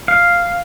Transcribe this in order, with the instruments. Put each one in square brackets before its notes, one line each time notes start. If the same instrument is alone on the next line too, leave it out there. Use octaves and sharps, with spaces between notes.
[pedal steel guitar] F5